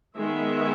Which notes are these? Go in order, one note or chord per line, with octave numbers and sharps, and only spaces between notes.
D#3 G#3 B3 E5